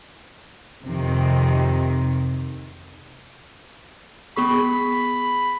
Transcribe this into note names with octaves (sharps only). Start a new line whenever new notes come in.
F2 C3 D#3
B3 G#4 B5 C#6